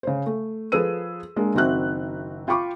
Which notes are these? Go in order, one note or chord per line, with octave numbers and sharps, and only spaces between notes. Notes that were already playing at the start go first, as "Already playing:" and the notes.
C#3 C5
A3
F3 G#4 A4 B4 E6 D#7
G#3 A#3 D4
F#1 D#3 C4 F#4 E5 F#6
F4 G5 B5 C#6 D6